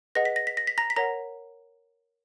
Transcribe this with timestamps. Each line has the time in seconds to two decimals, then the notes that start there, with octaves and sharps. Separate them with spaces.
0.15 G#4 B4 D#5 F#5 A#6
0.25 B6
0.36 A#6
0.47 B6
0.57 A#6
0.67 B6
0.78 A#5 A#6
0.90 B6
0.96 A#4 C#5 F#5 A#5 A#6